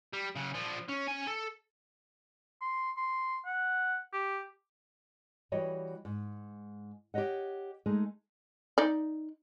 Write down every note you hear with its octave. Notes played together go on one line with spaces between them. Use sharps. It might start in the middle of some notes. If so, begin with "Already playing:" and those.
G3
C#3 F#3
F3 D4
C#4
C#4 G#5
A4
C6
C6
F#5
G4
E3 G3 F#4 C#5 D#5 G5
G#2
G4 A4 C#5 D#5 F#5
G#3 A3 D#4 G#4
D#4 D5